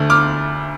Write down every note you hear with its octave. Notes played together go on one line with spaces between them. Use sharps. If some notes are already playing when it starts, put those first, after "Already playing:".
Already playing: D2 D3 A3
D6 F6